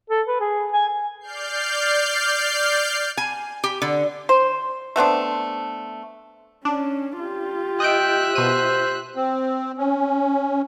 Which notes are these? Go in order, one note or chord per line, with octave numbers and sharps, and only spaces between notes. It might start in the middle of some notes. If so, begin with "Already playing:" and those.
A4
B4
G#4
G#5
D5 F6 G6 C7
G#5
G4
D3
C5
A3 B3 C4 D4
C#4 D4
F4 G4
D#5 E5 G5 F#6 G6 D7
B2 C5 D#7
C4
C#4